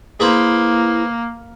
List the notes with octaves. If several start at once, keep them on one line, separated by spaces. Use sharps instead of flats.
A#3 E4 G#4 B4 C5